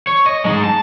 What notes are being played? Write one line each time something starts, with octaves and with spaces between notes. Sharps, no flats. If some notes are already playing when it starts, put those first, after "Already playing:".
C#5
D#5
G#3 D#4
A5